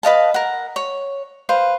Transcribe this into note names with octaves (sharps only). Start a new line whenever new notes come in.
B4 D#5 F5 A5
A#4 F#5
C#5
B4 C5 F5